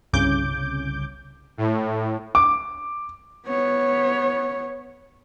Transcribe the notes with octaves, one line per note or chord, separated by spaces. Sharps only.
G1 C2 C#3 D6 G6
A2
D6
B3 C#5